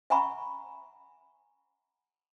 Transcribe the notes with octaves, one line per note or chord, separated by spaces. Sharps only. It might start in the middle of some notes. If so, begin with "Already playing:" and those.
E5 F#5 G#5 A#5 B5 C#6